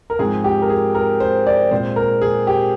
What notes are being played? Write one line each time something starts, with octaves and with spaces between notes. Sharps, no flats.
A#4
G#2 F3 G#3 C4 G#4
G4
A#4
G#4
A#4
C5
D5
A#2 G#3 C4 C5
A#4
G#4
G4